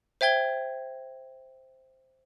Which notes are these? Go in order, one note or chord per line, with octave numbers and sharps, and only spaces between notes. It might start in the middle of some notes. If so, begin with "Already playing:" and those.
C5 E5 G5 G#6 G7